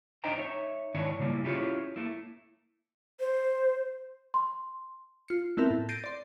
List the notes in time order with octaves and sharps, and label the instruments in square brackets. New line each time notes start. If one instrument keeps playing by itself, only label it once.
[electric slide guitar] D4 D#4 C5 D#5 G5 A#5
D#4 C#5 E5
G#2 D#3 D4 E4 C#5
A#2 C#3 G3 A#3 E4
C#4 E4 F4 G4 G#4 C#5
A3 A#3 E4
[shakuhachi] C5
[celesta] C6
[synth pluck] F4 C#7
A3 B3 C4 E4 A#4 E5
A2
G6 A6 A#6 C7 D7 D#7
D5 C6